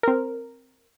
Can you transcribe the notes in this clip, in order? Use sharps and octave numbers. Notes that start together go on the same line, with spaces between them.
C4 A#4